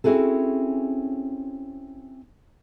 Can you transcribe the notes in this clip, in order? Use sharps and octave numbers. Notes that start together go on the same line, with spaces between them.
C4 C#4 E4 F#4 G#4 A4